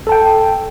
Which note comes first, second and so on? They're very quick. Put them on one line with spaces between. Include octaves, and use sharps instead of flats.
A4 A5 G5